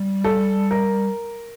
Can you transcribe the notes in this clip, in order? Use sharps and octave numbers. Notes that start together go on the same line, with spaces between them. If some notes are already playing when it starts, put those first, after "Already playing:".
Already playing: G3
A4
A#4